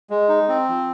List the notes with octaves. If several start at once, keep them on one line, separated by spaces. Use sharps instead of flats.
G#3
D#4
C4
F3